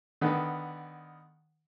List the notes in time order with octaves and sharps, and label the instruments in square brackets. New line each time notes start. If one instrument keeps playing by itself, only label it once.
[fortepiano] D3 D#3 B3 B4